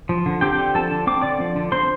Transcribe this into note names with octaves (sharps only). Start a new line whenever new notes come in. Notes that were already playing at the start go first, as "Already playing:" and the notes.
F3
D3
C4 G4 G5
D3
F3 A4 A5
D3
C4 D6
D3 D5 D6
F3
D3
C4 C5 C6